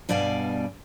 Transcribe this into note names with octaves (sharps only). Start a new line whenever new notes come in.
G2 B2 G3 D5 F5 G#5